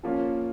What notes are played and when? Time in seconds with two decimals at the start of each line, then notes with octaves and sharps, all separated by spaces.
0.03 F3 A#3 C#4 F4